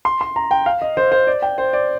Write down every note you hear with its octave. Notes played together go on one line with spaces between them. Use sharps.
C6
C6
A#5
G5
F5
D#5
C5
C5
D5
G5
C5
D5